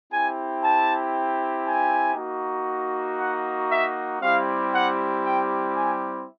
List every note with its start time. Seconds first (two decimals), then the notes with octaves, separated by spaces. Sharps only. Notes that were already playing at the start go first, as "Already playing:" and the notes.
0.11 C4 E4 G4 G#5
0.62 A5
1.66 G#5
2.16 A#3 D#4 F#4
3.19 F#5
3.70 E5
4.22 G3 C4 E4 G4 F5
4.73 F#5
5.25 G5
5.75 G#5